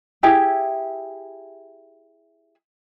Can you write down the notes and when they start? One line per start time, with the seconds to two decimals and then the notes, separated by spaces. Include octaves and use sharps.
0.23 E4 G4 G#4 E5